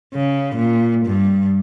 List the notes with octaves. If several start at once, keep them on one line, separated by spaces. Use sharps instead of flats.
C#3
A#2
G2